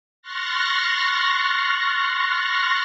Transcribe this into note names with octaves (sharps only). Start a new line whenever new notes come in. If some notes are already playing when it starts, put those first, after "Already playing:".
C6 C#6 F6 F#6 A6 A#6